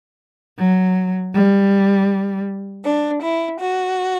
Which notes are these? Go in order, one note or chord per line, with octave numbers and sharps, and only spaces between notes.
F#3
G3
D4
E4
F#4